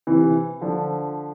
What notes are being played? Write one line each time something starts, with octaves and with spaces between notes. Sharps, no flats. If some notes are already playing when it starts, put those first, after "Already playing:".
C3 E3
D3 F3